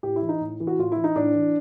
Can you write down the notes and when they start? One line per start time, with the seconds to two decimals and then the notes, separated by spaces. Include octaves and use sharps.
0.03 A2 G4
0.16 E4
0.22 E3
0.29 D#4
0.41 A2
0.60 E3
0.67 F#4
0.78 A2 F4
0.92 E4
0.97 E3
1.04 D#4
1.16 A2 D4
1.34 E3